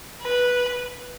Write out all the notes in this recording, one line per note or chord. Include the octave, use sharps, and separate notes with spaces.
B4